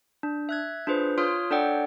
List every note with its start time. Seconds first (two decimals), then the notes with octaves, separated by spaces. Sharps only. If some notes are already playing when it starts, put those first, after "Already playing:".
0.23 D4
0.49 E5 F#6 G#6
0.87 D4 F4 G#4 B4 C5
1.18 F4 C#5 C6 D#6 F6
1.50 D4 A4 C#5 D5 F#5 G5